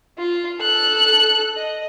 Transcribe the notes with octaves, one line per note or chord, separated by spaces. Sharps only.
F4
A4 F#6
D#5